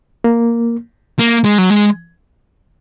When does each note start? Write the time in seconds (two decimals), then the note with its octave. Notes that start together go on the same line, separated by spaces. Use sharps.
0.24 A#3
1.19 A#3
1.44 G#3
1.58 F#3
1.70 G#3